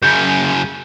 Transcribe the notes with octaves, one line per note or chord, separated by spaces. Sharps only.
F#2 C#3 G6